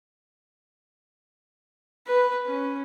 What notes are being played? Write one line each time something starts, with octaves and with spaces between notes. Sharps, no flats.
B4
C#4